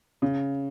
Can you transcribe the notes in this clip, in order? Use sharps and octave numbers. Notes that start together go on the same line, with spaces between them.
C#3